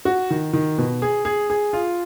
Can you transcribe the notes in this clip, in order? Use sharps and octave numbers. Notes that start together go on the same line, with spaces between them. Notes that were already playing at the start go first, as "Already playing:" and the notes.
F#4
D#3
D#3
B2
G#4
G#4
G#4
F4